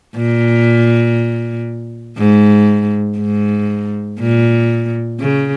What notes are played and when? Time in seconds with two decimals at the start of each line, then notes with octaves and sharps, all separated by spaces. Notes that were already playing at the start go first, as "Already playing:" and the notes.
0.16 A#2
2.17 G#2
3.18 G#2
4.19 A#2
5.19 C#3